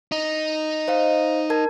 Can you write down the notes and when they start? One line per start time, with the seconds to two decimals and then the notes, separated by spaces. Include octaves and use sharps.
0.12 D#4
0.88 C5 D#5 F5
1.50 A#4 A5 G#6